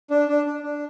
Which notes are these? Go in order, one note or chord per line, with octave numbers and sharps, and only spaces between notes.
D4
D4
D4
D4